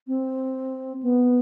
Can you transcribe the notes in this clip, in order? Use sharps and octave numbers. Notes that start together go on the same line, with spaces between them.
C4
B3